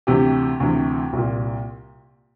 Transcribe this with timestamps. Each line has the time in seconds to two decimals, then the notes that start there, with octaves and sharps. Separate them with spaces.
0.07 D2 C3 E3 G4
0.60 D2 C3 E3
1.13 C2 A#2